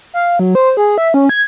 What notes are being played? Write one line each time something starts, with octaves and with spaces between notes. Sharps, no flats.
F5
F#3
C5
G#4
E5
C#4
G#6